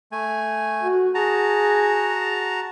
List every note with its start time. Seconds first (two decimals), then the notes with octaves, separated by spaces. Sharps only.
0.12 A3 G#5
0.83 F#4
1.15 F#4 G#4 A5 A#5